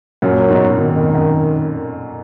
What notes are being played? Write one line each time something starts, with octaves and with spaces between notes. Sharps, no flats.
F#2 A#2 F#3
G#2 B2
G#2 B2 D#3
F2
G#2
F#2